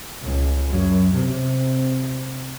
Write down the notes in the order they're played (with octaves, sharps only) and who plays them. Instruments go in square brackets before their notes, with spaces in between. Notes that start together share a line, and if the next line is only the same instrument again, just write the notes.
[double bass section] C#2
F#2
C3